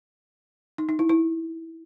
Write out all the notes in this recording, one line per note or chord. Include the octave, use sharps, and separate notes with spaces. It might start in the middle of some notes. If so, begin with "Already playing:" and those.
D#4
D#4
E4
E4